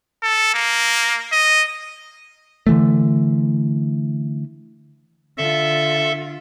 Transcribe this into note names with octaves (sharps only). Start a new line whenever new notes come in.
A4
A#3
D#5
D3 E3 A3
D3 F4 A4 E5